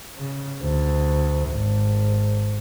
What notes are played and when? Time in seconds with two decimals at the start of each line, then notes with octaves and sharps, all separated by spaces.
0.18 C#3
0.62 D2
1.50 G#1